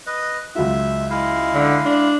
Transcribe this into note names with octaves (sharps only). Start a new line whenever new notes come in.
B4 D#5
C#2 F#3 F4 E5
G#3 E4 F5
D3
D4